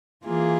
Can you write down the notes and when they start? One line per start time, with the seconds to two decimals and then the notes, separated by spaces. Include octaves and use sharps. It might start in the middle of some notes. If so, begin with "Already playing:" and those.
0.25 E3 A#3 F4 G#4